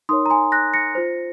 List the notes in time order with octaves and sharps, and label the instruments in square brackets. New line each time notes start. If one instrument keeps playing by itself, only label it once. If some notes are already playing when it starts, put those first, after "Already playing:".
[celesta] D#4 A#4 C#5 C6 D#6
A#5
G#5 C6
F#6 A#6
A#6 C#7
F4 C5